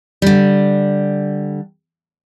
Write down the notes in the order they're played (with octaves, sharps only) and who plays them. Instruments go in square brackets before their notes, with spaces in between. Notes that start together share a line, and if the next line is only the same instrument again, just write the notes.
[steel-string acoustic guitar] D3 G3